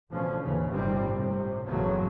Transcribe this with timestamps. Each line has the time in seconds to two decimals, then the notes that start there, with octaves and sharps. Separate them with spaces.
0.10 A1 B2 D3 F3 C#4
0.42 D#2 C#3 E3
0.72 G1 A2 C3 D#3 G3 C4
1.18 A2 C3
1.68 F#1 E2 A2 C#3 F#3 A3